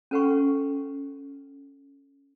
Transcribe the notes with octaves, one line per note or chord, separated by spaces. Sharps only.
C#4 A4 B4 F#5 G5 C#6